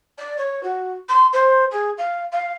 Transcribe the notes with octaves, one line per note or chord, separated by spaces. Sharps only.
D5
C#5
F#4
C6
C5
G#4
F5
F5